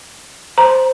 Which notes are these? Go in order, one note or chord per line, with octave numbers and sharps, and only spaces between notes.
C5 A#5